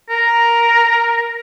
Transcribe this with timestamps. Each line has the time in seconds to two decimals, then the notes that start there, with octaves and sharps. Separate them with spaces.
0.10 A#4